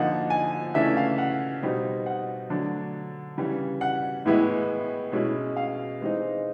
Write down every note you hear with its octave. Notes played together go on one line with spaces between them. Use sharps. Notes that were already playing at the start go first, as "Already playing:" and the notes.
Already playing: D3 F3 A#3 D#4 F#5
G#5
C#3 E3 A3 D4 E5
F5
F#5
B2 G3 C4 D#4
F#5
D3 F#3 A3 D4
C#3 E3 G3
F#5
A2 E3 G#3 B3 E4
B2 G#3 C#4 E4
F5
E3 G#3 C4 D#4